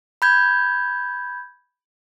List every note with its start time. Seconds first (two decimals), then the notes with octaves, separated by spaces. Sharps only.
0.22 B5 G6 G#6